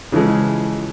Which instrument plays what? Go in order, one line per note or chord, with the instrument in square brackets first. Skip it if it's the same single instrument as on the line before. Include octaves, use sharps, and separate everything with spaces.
[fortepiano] C#3 E3 F3 G#3